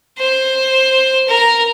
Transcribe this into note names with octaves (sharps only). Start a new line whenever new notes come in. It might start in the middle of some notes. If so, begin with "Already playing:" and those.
C5
A#4